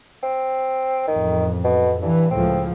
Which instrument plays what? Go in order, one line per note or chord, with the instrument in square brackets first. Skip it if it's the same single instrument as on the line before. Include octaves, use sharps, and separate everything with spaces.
[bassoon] C4
[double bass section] A1 F2 [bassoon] D#3
[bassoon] B2
[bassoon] G2 [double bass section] E3
[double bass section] C#2 A2 F3 [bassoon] C4